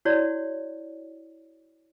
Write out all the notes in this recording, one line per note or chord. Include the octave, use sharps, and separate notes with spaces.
E4 F#4 C#5 D5